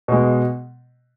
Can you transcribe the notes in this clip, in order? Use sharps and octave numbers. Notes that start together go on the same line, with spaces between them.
B2 G#3